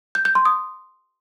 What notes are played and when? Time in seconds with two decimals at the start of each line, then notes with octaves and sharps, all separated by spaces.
0.15 G6
0.25 G6
0.35 C6
0.45 D#6